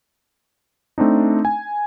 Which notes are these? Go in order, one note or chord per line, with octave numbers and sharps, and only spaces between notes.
A3 C4 D4 D#4
G#5